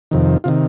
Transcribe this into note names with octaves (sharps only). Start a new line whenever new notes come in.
F2 C3 D#3
C3 D#3 F4